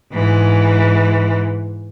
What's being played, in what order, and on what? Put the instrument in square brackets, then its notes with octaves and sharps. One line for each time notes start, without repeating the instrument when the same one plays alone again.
[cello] G#2 E3